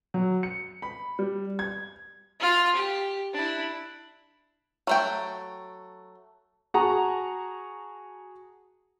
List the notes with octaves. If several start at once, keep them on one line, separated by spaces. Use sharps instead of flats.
F#3
C#7
B5
G3
G#6
F4 F6
G4
D4 E4
F#3 A3 G5
F#4 G#4 F#5 A5 A#5 C#6